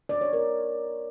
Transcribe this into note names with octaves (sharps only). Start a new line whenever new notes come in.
D5
C#5
A#4